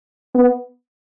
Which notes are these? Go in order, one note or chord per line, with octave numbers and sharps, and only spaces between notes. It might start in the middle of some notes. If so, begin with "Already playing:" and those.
B3